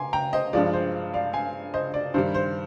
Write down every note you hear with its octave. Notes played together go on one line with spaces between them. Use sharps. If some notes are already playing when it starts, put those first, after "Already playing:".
Already playing: G#5 A#5 C6 D6
G5 A#5
C5 D#5
G2 F3 G#3 D5
C5
D5 F5
F5 G#5
C5 D#5
D5
G2 D#3 G3 C5
C5